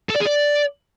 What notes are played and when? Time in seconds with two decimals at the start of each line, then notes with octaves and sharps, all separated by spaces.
0.10 A4
0.16 D5
0.21 G#4
0.27 D5